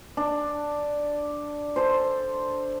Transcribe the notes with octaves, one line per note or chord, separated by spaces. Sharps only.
D4
A4 C5